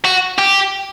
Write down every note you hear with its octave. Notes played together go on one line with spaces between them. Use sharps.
F#4
G4